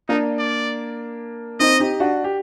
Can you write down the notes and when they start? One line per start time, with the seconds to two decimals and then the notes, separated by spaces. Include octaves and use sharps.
0.08 A#3 D4 D#4
0.39 D5
1.60 C4 D#4 D#5
1.80 D#4 G4
2.00 D4 F#4
2.24 G4